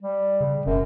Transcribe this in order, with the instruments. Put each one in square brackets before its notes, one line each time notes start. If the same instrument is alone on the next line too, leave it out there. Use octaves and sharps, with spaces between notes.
[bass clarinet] G3
[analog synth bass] C#3
[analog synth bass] E1 [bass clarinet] F#2